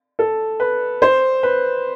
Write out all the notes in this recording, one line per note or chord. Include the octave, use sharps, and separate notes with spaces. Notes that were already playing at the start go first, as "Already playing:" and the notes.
A4
B4
C5
B4